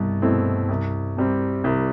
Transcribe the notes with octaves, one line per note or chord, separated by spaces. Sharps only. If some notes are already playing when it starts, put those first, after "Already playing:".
Already playing: C2 G2 B2
B2 A3 C4 E4
C2
C3 G3 C4
C2